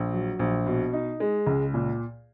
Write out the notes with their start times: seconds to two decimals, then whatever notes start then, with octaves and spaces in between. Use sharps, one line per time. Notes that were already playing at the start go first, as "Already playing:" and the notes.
Already playing: A#1
0.13 F#3
0.39 A#1
0.66 B2
0.93 D#4
1.20 G#3
1.47 C#2
1.74 A#2